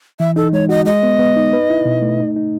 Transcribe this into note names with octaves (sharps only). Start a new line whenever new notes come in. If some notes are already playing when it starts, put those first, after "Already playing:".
E3 E5
D#4 A4
G#3 C#5
F#4 D#5
G#3 D#5
B3
B3
D#4
B4
E4
B2
A3
D#4
D#4